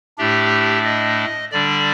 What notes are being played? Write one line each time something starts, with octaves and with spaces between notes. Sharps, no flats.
A2 A3 D4 G4
D#5
D3 G3 D4 D5